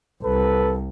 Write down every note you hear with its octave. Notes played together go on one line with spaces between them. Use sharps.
C2 A4 B4